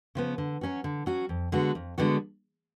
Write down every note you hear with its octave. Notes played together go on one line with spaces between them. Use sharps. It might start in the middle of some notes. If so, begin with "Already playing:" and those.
C#3 F3 B3
D3
F#3 C#4 F#4
D3
F#3 C#4 F#4
F2
D3 G#3 B3 F#4
F2
D3 G#3 B3 F#4